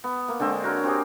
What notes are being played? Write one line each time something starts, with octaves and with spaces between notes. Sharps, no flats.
B3
A#3
D3 G#3 C4 C#6
F#4 A#4 C#5
C4 G4 G#4